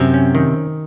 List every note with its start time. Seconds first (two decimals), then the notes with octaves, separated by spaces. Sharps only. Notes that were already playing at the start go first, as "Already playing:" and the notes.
Already playing: F#2 C3 C4
0.14 C#4
0.35 D#3